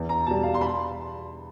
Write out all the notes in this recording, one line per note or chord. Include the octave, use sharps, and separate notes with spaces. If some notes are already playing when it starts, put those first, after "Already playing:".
Already playing: E2
A#5
B2 G3 A5
F5
C6
B5